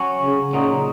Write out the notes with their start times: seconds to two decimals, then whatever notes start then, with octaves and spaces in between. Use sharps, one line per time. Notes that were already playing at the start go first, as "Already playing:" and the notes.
Already playing: F#3 C#4 F#4
0.22 C#3
0.53 A#2 C#3 F#3 D#4